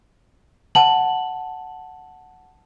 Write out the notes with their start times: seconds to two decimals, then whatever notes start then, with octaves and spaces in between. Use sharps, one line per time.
0.75 F#5 A5 F#7